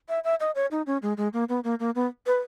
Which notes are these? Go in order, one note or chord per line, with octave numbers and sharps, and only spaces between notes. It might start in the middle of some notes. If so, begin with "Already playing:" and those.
E5
E5
D#5
C#5
D#4
C#4
G#3
G#3
A#3
B3
A#3
A#3
B3
B4